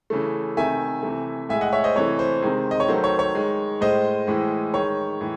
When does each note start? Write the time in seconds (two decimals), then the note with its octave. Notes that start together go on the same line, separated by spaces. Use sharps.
0.10 C#3 E3 A3
0.57 C3 D#3 A3 E5 G#5
1.03 C3 E3 A3
1.49 A2 G#3 E5 G#5
1.61 D#5 F#5
1.72 C#5 E5
1.84 C5 D#5
1.96 C3 E3 A3 C#5
2.19 C5
2.42 C3 D#3 G#3
2.71 D#5
2.80 C#5
2.88 D#3 F#3 A3 C5
3.04 C#5
3.19 C#5
3.35 D#3 G#3
3.81 A2 G#3 C5 D#5
4.27 A2 E3 G#3
4.73 D#3 G#3 C#5
5.21 A2 E3